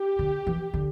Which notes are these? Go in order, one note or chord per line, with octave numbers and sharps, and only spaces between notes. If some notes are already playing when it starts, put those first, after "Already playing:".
Already playing: G4
D3
E3
D3